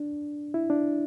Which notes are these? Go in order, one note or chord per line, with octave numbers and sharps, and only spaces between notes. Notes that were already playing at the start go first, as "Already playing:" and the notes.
Already playing: D4
E4
D4